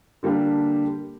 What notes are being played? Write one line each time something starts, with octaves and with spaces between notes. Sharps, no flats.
D3 G3 A#3 D4 G4